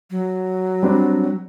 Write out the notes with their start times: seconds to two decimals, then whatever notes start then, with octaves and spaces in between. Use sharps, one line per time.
0.11 F#3
0.83 G3 C4 D4